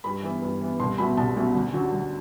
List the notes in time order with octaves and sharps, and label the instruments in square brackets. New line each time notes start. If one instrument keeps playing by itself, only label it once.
[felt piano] G2 B5
E3 B3
G2
E3 B3
C2 C6
B2 F#3 A3 B5
C2 A5
B2 F#3 A3
D2
D3 F#3
D2